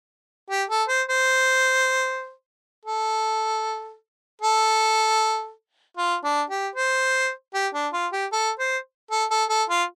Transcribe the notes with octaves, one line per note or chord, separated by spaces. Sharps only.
G4
A4
C5
C5
A4
A4
F4
D4
G4
C5
G4
D4
F4
G4
A4
C5
A4
A4
A4
F4